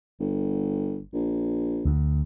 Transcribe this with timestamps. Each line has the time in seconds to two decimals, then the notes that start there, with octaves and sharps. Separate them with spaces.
0.20 G1
1.14 A#1
1.86 D2